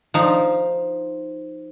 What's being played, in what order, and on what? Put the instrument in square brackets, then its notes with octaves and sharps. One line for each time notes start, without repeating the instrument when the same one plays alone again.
[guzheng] F3 D#4